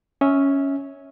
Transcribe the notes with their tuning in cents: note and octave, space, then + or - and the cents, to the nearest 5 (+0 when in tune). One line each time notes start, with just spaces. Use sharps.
C#4 +0 E5 -25